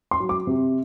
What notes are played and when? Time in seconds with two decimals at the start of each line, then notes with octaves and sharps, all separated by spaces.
0.11 C6
0.20 F#3
0.29 D6
0.47 C3